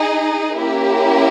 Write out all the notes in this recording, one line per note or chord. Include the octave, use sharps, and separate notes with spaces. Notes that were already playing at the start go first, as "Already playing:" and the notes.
Already playing: D#4 G#4 D#5
A#3 C#4 E4 G4 A#4